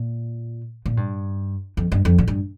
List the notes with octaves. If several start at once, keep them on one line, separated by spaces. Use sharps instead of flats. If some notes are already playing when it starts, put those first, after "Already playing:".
Already playing: A#2
A#2
G2
F2
G2
F2
A#2
G2